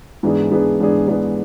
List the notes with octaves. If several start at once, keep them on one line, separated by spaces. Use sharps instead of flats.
G#2 E3 B3 D4 G#4
G#2 E3 B3 D4 G#4
G#2 E3 B3 D4 G#4
G#2 E3 B3 D4 G#4